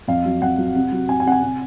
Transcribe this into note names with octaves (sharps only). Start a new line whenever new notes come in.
F2 F5
F#3
F2 F#5
F#3
C3
F#3
C3 G#5
G#5
C3 F#5
G#5
C3